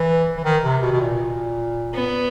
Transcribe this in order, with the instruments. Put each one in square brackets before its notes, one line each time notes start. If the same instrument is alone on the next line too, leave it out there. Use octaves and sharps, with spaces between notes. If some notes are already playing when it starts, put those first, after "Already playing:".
Already playing: [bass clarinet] E3
E3
D#3
C3
B2
B2
A#2
[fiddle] B3